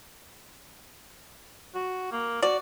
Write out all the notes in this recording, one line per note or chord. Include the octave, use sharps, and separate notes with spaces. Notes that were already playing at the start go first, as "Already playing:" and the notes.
F#4
A#3
F#4 D5